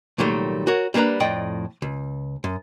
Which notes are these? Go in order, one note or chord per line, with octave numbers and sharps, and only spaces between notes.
C2 A#2 D#3 F#3 G3 A3
F#4 A#4 C#5
G3 A#3 D4 B4 A#5
F2 A2 D5 D#5 G5
C#2
F#2